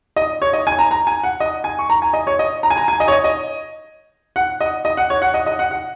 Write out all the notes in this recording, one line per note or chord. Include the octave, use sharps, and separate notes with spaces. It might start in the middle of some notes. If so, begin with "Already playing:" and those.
D#5
C#5
D#5
G#5
A#5
A#5
G#5
F#5
D#5
G#5
C#6
A#5
G#5
D#5
C#5
D#5
A#5
G#5
A#5
G#5
D#5
C#5
D#5
D#5
F#5
D#5
D#5
F#5
C#5
F#5
D#5
D#5
F#5
F#5